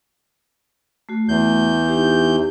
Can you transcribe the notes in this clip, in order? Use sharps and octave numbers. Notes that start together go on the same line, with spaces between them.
A3 F#4
E2 G6
D#4 G4